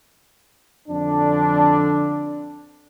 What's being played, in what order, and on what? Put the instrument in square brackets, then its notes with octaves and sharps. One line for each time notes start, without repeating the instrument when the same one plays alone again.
[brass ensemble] F2 D3 D4